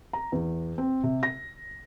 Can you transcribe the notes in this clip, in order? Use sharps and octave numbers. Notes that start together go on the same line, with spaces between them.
A#5
E2
C4
C3
A#6